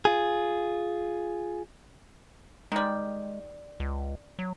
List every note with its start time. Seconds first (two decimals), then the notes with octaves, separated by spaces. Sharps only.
0.05 F4 G#4
2.72 D#3 G3 G#3
3.80 C#2
4.39 F#3